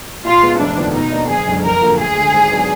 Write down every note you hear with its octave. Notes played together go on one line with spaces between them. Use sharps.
A#2 F4
G#3 B3
F1 D4
D#2 D3 F3 B3
B2 D#4
A#3 D4
F#1 G#4
F#2 D3 G#3 D4
F2 A#4
D3 F#3 A#3 F4
D2 G#4
D3 G#3
G#1
F#3 B3 D4